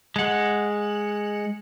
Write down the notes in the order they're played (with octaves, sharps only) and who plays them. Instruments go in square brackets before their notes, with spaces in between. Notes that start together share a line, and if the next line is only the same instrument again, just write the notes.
[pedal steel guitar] G#3 F#5